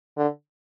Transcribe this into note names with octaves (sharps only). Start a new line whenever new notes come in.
D3